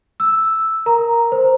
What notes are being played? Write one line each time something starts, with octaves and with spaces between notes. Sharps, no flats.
E6
A#4 A#5
C5